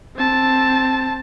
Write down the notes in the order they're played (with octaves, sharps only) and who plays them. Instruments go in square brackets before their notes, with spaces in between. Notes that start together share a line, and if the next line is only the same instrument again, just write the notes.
[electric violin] C4 A5